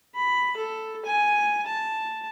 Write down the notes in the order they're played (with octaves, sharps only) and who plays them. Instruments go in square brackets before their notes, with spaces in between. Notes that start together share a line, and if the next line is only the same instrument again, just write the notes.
[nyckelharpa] B5
A4
G#5
A5